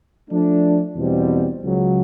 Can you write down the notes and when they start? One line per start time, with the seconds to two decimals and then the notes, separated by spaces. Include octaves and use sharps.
0.29 F3 A3 D4
0.95 E2 B2 G3 C4
1.63 C#2 C#3 F#3